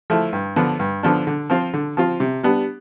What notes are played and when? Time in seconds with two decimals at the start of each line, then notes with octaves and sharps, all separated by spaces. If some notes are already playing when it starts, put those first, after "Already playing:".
0.10 F3 A3 E4
0.33 G2
0.56 D3 F3 B3 D4
0.80 G2
1.03 D3 F3 B3 D4
1.27 D3
1.50 F3 C4 F4
1.74 D3
1.97 F3 C4 F4
2.20 C3
2.43 G3 B3 D4